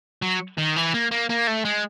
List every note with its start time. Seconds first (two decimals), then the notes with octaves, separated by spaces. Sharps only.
0.22 F#3
0.58 D#3
0.76 E3
0.94 A#3
1.11 A#3
1.29 A#3
1.47 A3
1.65 G#3